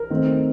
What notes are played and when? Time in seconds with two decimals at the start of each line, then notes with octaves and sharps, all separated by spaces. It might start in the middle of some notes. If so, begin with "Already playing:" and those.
Already playing: A#4
0.10 D#3 A3 C4